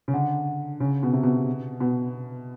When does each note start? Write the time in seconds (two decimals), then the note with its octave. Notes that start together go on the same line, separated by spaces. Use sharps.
0.08 C#3
0.13 D3
0.80 C#3
1.03 B2
1.13 C3
1.23 B2
1.80 B2